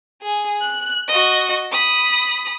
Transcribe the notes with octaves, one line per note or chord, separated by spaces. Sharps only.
G#4
F#6
F#4 D#5
B5 D#6